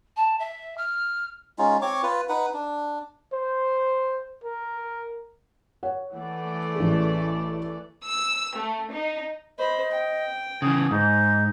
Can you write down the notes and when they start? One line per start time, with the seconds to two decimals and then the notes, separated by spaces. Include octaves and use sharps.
0.16 A5
0.39 E5
0.77 F6
1.58 G#3 C#4 D#4 F4
1.82 C4 C#5 C#6 D6
2.03 F4 B4
2.29 D#4 B4 F#5
2.54 D4
3.33 C5
4.44 A#4
5.83 C#5 F#5
6.15 E3 A3 D5
6.75 A1 G#4
8.04 E6
8.56 A3
8.92 D#4
9.58 C5 D#5 B5
9.92 G5
10.62 C#3 E3 D#6
10.91 G#2 D#4 C5